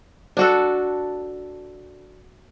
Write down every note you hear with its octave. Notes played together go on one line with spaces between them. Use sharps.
D4 F#4 A4